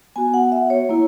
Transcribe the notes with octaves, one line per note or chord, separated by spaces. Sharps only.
B3 F#4 G#5
F#5
E5
C#5
A#3 E4